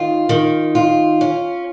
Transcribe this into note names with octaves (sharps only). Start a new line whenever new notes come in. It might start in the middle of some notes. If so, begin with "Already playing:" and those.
Already playing: D#3 F4
D#3
F4
C#4